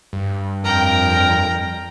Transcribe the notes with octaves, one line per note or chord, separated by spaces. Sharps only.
G2
F2 A#4 G5 A#5